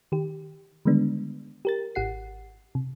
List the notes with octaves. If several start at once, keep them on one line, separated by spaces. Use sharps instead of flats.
D#3 G4
D3 D#3 G3 G#3 B3 D4
G4 A#4 A6
G#1 G4 F#5 C7
C3